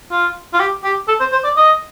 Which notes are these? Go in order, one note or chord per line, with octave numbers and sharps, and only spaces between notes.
F4
F4
G4
G4
A4
C5
C5
D5
D#5